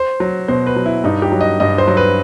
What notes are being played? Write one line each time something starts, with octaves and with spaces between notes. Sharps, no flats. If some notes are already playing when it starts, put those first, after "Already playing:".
Already playing: C5
F#3
B2 C5
B4
F#3
E4
G2 D#4
G4
F#3
D#5
G2 D#5
C5
F#3
B4